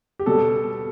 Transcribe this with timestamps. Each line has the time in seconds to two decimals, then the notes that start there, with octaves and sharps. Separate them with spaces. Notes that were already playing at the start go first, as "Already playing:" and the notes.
0.19 G4
0.26 B2 G3 A4